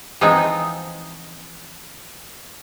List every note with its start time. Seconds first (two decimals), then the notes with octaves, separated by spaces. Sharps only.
0.21 E3 F3 G#3 B3 C4 D#4